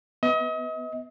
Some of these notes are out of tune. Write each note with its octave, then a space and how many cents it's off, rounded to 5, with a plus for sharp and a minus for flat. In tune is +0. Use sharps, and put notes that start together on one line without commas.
B3 +5 D#5 +40